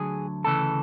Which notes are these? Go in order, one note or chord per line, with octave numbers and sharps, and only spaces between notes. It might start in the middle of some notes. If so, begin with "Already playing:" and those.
Already playing: D2 D3 F#3 G#4
D2 C#3 E3 A4